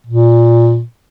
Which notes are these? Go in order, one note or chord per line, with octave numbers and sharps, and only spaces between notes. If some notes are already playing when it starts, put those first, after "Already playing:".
A#2